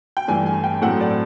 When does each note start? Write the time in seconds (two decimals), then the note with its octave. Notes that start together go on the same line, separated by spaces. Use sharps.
0.17 G5
0.28 G2 E3 A3 D4 G#5
0.46 G#5
0.64 G5
0.81 A2 F#3 A3 C4 F#5
1.00 D5